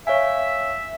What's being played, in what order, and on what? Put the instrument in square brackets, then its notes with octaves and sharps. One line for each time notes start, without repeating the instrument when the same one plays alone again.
[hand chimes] C#5 F5 G#5 [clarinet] E5